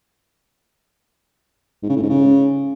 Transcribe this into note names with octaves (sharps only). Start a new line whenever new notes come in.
G#2
C#3
A2
G#2
C#3